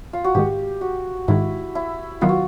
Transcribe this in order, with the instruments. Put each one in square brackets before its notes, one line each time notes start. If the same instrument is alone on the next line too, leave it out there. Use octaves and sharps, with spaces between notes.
[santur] F4
F#4
[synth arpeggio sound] G#2 D#3 G#3 [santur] G4
[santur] F#4
[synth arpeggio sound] G#2 D#3 G#3 [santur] E4
[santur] E4
[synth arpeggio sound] D#3 F#3 B3 [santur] F4
[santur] F#4